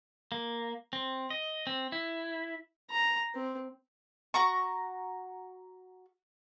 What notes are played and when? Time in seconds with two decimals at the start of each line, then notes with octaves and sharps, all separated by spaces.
0.32 A#3
0.93 C4
1.30 D#5
1.67 C4
1.92 E4
2.91 A#5
3.35 C4
4.34 F#4 A#5 C#6